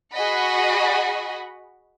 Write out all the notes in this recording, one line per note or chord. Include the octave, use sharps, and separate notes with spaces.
F#4 G#4 D#5 F#5 B5